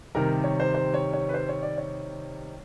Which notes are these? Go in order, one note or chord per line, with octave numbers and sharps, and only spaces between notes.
C3 D#3 G3 A#4
C#5
C5
C5
C#5
C#5
B4
C5
C#5
D5
C#5